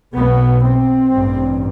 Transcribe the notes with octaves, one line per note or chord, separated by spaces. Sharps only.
B1 B2 B3
C4
A1 G2